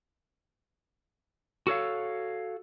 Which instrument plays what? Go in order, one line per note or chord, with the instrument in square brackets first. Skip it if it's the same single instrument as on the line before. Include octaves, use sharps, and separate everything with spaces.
[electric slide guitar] F#4 A4 C#5 F5